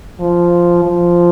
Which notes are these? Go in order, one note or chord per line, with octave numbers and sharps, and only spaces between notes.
F3
F3